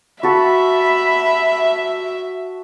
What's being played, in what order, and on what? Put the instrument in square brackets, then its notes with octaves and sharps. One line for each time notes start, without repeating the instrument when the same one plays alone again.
[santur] F#4 A4 [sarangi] E5 [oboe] B5